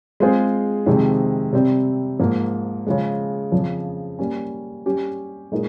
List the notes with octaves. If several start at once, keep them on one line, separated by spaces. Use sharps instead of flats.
G#3 C4 F4 G#4 C5
F2 C3 D#3 G#3
C3 G3 C4
G#2 F3 A#3
C#3 F3 G#3
F2 C#3 F3
G3 A#3 C#4
G3 C#4 G4
A#2 G#3 D#4 A#4